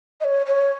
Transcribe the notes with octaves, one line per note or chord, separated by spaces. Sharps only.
D#5
C#5
C#5